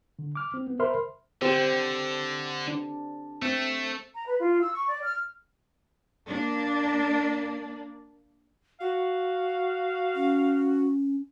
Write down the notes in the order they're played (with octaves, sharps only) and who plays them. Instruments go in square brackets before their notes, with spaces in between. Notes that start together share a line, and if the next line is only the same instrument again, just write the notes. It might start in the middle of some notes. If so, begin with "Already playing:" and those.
[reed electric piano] D3
D6 F6
C4
B3
A#4 C5 E5 B5 C6 F6
[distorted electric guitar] D3 [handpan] C4 G4 C5
[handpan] D4
[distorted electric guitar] A3 [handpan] C4
[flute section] A#5
B4
F4
E6
C#6
D5
F6
[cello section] A#3 D4
[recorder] F#4 [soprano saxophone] F5
[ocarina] C#4